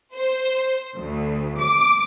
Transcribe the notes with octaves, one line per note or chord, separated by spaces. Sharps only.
C5
D2
D6